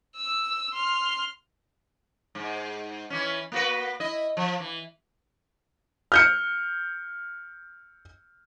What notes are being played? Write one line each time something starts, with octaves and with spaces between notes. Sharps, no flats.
E6
C6 F6
G#2
E3 C#4
A#3 F#4 B4
E4 D#5
F3
E3
F6 G6 C#7